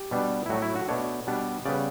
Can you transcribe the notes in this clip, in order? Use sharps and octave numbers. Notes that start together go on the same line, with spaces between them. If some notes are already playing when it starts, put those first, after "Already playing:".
Already playing: G4
B2 G3 B3 D4
E4
A2 F#3 A3 F#4
E4
F#4
B2 A3 D4 C#5
B2 G3 B3 D4
C#3 G3 B3 D5